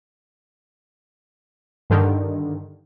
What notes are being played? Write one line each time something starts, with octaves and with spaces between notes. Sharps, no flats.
G2 D3 D#3